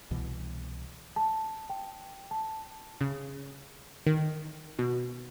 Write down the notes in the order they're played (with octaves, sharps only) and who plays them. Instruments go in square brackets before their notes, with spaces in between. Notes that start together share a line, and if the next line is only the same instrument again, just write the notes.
[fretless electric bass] C2 B2 E3
[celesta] A5
G5
A5
[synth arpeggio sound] C#3
D#3
B2